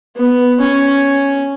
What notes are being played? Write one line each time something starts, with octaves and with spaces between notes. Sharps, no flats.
B3
C#4